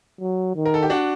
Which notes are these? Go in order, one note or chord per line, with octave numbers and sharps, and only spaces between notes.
F#3
D#3
A#4
A4
G4
D4 F#4